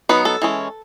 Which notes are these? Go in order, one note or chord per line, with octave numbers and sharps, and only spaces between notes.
F#3 B3 D#4 B4
A4
E3 G#3 C#4